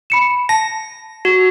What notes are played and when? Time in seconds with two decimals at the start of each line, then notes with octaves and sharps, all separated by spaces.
0.10 B5 C#7 E7
0.49 A5 A#6
1.25 F#4